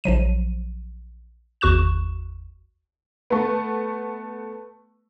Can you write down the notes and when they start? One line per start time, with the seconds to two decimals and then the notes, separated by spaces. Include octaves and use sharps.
0.04 A#1 F3 F#3 D#7
1.61 G#1 E2 F#4 C#6 F#6 E7
3.30 A3 B3